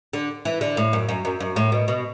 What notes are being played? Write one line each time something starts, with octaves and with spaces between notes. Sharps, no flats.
D3
E3
D3
A2
F#2
F#2
F#2
F#2
A2
B2
B2